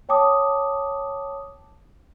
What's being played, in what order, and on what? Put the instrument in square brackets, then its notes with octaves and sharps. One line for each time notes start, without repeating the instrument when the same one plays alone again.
[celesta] C#5 G5 A5 D6 D#6